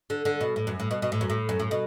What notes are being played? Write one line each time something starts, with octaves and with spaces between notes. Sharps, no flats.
D3
D3
B2
A2
F#2
A2
B2
B2
A2
F#2
A2
F#2
A2
B2